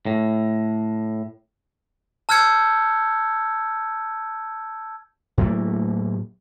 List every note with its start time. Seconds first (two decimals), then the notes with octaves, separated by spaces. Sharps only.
0.06 A2
2.29 A5 E6 F6 G6 G#6 C#7
5.38 A2 F#3 A3 A#3